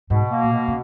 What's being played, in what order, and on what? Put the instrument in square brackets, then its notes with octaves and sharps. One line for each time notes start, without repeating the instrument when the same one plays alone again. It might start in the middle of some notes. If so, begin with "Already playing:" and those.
[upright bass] G#2 [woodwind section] B2
[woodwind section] A#3
[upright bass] A#2
[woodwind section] B2
[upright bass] C#3